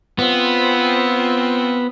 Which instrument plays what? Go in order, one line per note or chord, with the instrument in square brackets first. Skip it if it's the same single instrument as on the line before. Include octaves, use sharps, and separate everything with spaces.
[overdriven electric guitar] B3 [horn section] C4 F4